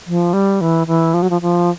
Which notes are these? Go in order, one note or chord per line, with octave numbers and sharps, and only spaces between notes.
F3
G3
E3
E3
F3
F#3
F3
F3